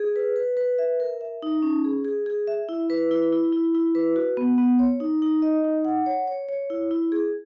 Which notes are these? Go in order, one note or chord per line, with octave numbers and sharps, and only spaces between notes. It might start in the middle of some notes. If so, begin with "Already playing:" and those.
Already playing: G#4
B4
B4
B4
E5
A#4
E5
D#4
C#4
G#4
G#4
G#4
E5
E4
B4
E4
E4
E4
E4
B4
F#4
B3
B3
C#5
D#4
D#4
D#5
D#4
F#5
C#5
C#5
C#5
E4
E4
G#4